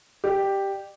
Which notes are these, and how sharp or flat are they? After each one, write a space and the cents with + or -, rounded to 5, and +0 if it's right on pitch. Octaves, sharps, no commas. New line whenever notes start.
G4 +0 D5 +35